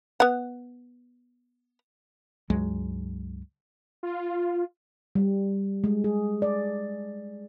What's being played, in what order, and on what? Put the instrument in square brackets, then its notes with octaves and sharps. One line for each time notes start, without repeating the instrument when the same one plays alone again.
[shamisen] B3 F#5
[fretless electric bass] C#2 G2 F#3 G#3
[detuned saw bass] F4
[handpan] G3
G#3
G#4
D5